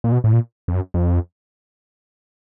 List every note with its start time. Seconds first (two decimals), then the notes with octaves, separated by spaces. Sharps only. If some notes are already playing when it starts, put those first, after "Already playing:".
0.04 A#2
0.12 B2
0.24 A2
0.33 A#2
0.68 F2
0.74 F#2
0.94 F2